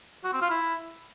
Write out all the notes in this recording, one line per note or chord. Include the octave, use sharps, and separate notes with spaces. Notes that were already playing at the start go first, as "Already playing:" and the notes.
F#4
C4
F4
E4